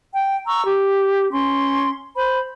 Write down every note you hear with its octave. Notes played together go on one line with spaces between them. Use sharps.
G5
A#5 C#6 E6
G4
C#4 C6
C5 B5